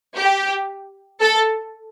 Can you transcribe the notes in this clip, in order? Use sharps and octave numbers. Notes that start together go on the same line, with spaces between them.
G4
A4